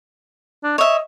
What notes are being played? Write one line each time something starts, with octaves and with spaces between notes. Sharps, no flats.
D4
C#5 D#5 E5